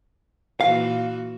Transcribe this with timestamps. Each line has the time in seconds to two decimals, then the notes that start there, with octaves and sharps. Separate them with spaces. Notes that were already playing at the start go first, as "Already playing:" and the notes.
0.61 A#2 E3 F#4 F5